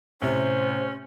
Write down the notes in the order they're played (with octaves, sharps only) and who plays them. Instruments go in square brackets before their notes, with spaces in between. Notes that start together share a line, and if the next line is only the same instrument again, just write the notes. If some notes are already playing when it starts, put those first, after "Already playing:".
[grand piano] A2 C3 [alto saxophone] C#4 [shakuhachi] C5